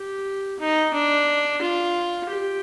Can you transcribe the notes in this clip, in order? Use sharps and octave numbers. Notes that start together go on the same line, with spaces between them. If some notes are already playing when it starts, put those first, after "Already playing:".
Already playing: G4
D#4
D4
F4
G4